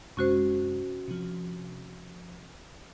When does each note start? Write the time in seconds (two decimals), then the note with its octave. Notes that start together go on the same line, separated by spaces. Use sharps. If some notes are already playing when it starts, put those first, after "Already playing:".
0.17 F#2 C3 G#3 C#4 F#4 C5
1.08 C3 F3